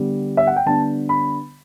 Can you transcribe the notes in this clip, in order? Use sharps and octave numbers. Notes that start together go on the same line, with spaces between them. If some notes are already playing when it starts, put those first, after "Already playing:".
Already playing: D3 G3 B3
E5
F#5
G5
D3 G3 B3 D4 A5
B5